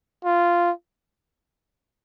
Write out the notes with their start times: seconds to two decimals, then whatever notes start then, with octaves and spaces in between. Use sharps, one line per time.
0.24 F4